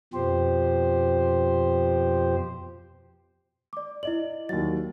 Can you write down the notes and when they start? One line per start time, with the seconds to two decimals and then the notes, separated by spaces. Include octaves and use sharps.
0.14 F2 B2 F3 G4 C5
3.73 D5 D6
4.03 E4 D5 D#5 F#7
4.49 D#2 F#3 A6